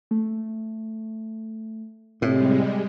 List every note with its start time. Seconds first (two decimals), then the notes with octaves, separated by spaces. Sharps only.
0.11 A3
2.22 A2 C3 G3 G#3